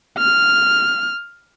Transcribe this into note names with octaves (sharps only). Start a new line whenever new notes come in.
F6